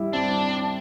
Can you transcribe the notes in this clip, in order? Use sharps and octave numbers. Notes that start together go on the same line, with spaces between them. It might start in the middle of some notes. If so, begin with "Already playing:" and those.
Already playing: G3 E4
C4 D4